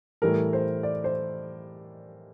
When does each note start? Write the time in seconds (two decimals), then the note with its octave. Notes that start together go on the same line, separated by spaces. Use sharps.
0.22 A2 E3 G3 A#4
0.53 C5
0.83 D5
1.04 C5